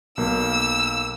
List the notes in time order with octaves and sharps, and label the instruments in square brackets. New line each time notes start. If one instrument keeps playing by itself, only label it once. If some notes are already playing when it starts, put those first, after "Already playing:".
[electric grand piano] B1 A#3 [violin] E6